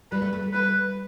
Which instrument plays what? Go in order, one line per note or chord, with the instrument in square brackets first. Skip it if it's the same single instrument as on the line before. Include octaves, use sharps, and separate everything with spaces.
[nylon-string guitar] G3 [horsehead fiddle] B4
[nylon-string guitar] A3
A3
G3
[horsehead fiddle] B4